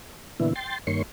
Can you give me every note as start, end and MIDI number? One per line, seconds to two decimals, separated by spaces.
0.40 0.53 46
0.40 0.53 50
0.40 0.53 52
0.40 0.53 59
0.40 0.53 64
0.56 0.78 79
0.56 0.78 84
0.56 0.78 93
0.87 1.03 43
0.87 1.03 51
0.87 1.03 58
0.87 1.03 73
0.87 1.03 84
0.87 1.03 85